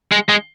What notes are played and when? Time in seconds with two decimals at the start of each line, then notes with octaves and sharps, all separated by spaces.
0.12 G#3
0.29 G#3